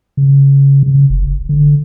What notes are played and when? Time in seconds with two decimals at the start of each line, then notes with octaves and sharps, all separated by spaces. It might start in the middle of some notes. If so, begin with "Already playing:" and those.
0.17 C#3
0.83 C#3
1.10 F#1
1.27 G1
1.49 D3